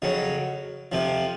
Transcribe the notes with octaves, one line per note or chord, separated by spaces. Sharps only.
F2 C#3 F#3
F2 C3 F3